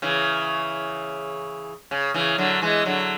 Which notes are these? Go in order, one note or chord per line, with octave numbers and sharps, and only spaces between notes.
C#3 E3
C#3
C#3 E3
D3 F#3
E3 G#3
D3 F#3